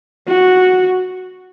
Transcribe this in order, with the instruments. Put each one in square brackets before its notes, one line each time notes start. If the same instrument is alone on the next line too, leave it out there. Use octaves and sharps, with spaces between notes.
[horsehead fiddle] F#4